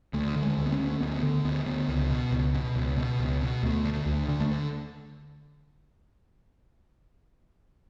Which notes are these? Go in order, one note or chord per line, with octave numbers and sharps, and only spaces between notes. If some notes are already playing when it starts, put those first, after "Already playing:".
D2 A3
D3
G#3
D2
B3
C#4
D3
D2 B3
D3
D2 B3
D3
C#2
B2
C#2
B2
C#2
B2
C#2
B2
D2 A3
D3
D2
D3
A3